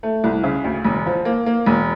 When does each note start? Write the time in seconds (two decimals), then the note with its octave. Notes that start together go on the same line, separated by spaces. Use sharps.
0.03 A3
0.24 C2
0.44 C#3
0.64 D2
0.84 E1
1.06 F3
1.25 A#3
1.46 A#3
1.66 E1